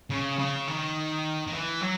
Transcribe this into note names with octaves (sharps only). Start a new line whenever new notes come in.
C#3
C#3
D#3
D#3
E3
F#3